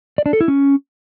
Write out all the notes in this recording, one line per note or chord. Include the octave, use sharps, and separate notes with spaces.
D5
D4
A4
E4
C#4